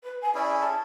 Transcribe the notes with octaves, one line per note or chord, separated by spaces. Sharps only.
B4
G#5
C#4 E4 G#4 D5
A5